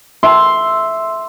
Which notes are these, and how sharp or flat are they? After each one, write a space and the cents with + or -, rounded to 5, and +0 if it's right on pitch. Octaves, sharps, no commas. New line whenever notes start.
E5 +0 C6 +0